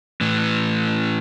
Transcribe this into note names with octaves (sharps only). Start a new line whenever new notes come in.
A2 E3